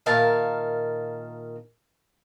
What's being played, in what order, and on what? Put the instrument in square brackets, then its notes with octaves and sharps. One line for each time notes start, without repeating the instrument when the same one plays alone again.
[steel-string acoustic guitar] A#2 D#3 A#4 E5 F5 A5